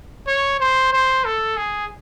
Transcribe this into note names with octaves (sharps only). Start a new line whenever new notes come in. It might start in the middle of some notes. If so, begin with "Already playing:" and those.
C#5
C5
C5
A4
G#4